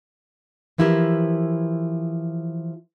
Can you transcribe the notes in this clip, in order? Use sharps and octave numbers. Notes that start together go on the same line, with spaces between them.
E3 F3 E4 G4 G#4 A#4